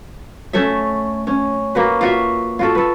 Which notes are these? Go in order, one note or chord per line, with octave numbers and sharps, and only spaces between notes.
A3 C#4 A4 E5
C#4
A#3 F#4 B4
F4 F#4 E5
F4 F#4 A4
A4 B4